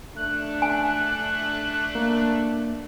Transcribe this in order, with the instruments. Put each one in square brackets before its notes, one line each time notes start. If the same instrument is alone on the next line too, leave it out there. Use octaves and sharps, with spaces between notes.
[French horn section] A3 D4 [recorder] F#6
[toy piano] G#5
[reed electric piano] A#3